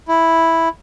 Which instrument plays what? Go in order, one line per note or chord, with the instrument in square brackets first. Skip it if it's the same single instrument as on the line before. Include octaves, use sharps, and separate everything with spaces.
[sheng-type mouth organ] E4